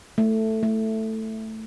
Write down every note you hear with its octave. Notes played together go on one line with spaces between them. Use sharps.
A3
A3